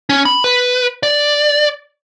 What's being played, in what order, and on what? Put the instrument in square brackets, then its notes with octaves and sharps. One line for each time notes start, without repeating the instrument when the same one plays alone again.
[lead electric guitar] C#4
B5
B4
D5